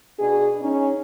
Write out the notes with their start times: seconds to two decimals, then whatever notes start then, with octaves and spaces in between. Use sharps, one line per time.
0.19 B2 D4 G#4
0.61 C#4 D#4